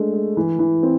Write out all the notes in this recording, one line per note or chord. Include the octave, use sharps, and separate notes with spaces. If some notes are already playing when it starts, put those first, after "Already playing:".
Already playing: G#3 A3 D4
G#3
E3
E3
C4